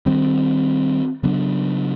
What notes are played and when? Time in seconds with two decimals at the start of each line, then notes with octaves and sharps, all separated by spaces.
0.06 D#3 G3 C4
1.23 C#3 F#3 B3 D4